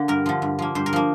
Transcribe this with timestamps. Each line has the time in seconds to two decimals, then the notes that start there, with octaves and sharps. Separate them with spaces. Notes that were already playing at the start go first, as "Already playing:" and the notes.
Already playing: D3 A#3 D4
0.08 G2 A#4
0.26 D3 F3
0.42 G2
0.59 F3 A#3
0.75 G2 C5
0.86 A#4
0.93 F3 A#3